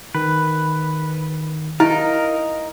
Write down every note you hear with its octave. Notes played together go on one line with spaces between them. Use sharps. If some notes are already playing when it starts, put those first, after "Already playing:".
D#3 B4
D#4 E4 A#4 F5